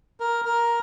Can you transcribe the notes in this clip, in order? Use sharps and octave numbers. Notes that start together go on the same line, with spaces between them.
A#4
A#4